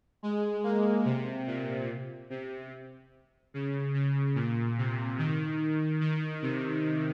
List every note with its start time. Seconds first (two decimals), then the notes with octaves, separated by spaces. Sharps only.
0.23 G#3
0.64 A#3
1.05 C3
1.47 A#2
2.30 C3
3.54 C#3
3.94 C#3
4.35 A#2
4.78 C3
5.18 D#3
6.01 D#3
6.42 C3